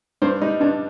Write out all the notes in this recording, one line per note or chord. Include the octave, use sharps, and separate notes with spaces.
G2 C5
G3 D#4
G2 D4